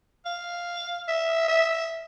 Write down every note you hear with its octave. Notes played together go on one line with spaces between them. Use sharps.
F5
E5
E5